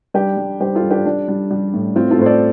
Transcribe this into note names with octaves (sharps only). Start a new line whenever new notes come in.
G3 D4 G4
G3
G3 G4 C5
F4 A4
G3
D4 G4
G3 D4
G3
G3
A2
A2 C4 F4
F4 A4
A2 C5
A4 D5